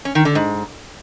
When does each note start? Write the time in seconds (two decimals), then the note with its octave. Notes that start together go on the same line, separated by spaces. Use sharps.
0.05 C#4
0.15 D#3
0.25 D3
0.35 G#2